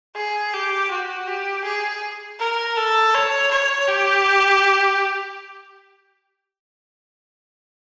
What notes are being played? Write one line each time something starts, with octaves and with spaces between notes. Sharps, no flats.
G#4
G4
F#4
G4
G#4
A#4
A4
C#5
C#5
G4